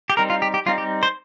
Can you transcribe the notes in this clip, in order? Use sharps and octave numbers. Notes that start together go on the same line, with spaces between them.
G4
G3 C4 D#4 A#4
F4
G4
G4
G3 C4 D#4 F4
G4
C5